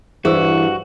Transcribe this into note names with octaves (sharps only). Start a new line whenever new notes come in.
G2 E3 E4 F#4 G#4 C5 E6